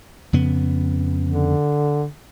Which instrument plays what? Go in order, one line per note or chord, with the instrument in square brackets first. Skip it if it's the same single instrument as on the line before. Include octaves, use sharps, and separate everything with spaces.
[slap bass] F2 C#3 B3
[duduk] D3